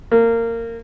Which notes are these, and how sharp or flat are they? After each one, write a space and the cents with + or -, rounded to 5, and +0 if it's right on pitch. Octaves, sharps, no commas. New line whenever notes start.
A#3 -20